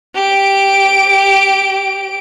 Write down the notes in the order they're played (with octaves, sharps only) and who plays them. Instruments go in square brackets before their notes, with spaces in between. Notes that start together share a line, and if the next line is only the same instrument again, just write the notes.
[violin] G4 D7